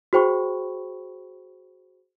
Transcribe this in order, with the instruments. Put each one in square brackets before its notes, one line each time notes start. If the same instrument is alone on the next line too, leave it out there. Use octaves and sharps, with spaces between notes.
[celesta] F#4 G#4 C5 G5 B5 C#6